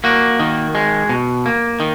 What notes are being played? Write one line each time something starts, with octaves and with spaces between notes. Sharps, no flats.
A#3 F#4
D#3
G#3
B2
A#3
D#3